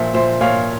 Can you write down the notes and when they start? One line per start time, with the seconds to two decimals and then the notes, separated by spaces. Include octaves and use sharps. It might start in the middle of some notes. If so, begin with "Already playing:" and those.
Already playing: A#2 F3 C5 E5
0.14 A#2 C5 E5
0.41 A#2 C#5 F5